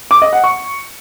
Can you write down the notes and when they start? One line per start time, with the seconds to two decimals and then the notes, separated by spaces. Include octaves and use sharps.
0.11 D6
0.22 D#5
0.33 F#5
0.44 C#6